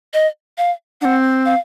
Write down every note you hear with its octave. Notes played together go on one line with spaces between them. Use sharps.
D#5
F5
C4 D4 F#5
F5